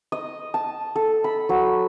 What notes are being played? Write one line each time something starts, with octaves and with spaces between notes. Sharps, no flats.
D#5
A5
A4
B5
F#3